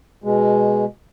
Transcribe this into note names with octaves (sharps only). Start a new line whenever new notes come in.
B2 G#3